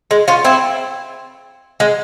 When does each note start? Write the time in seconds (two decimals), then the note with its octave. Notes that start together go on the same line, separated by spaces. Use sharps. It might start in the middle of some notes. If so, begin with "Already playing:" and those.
0.11 G#3
0.28 C#4 F4
0.44 C4 E4
1.80 G#3